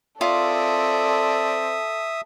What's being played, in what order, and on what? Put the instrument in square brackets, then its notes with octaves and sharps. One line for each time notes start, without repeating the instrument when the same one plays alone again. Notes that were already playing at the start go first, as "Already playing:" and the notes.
[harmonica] C4 D5 [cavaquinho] F4 [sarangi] A4 [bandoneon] E5 D#6